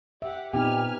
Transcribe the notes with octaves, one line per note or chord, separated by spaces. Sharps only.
G4 E5 F#5
A#2 B3 C4 D#4 G4 B4 G#5 F6